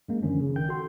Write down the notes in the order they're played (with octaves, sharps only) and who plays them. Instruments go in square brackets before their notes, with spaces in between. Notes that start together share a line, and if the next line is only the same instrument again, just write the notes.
[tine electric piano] F#2 G#3 A#3
D3 D#3 F3 C#4 D4
C#3
G1 D#3 G5 G6
F#4 A4 C6